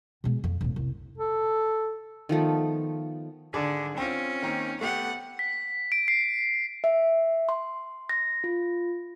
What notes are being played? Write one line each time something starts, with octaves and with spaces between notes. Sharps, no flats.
B2 G#3
F2
E1 A2
C2
A4
D#3 F3 A3 B3
G#1 D3 G#4 D6
C4 C#4 F4
D#3 A#3 C4
A3 B3 G4 F#5
B6
D7
C7
E5
C6
A#6
F4